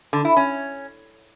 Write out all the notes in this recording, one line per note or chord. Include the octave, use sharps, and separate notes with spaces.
D3
E4
C#4